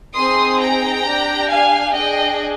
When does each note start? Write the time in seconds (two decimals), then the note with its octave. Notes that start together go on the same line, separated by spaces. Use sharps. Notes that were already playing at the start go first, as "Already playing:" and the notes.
0.15 C4 D#4 G#4 C6 D#6
0.59 G5 A#5
1.05 D4 G4
1.50 F5 G#5
1.94 D4 G#4 D#5 G5